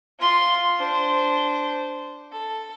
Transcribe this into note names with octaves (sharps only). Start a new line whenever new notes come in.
F4 C6
D4 C5
A4